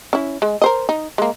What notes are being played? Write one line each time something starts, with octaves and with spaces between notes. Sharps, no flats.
C#4 E4
G#3
A#4 C5 D#5
D#4
G#3 A#3